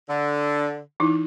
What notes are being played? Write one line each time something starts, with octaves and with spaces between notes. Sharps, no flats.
D3
E3 D#4 E4